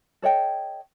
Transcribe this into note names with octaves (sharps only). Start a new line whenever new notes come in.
A4 C#5 D#5 G5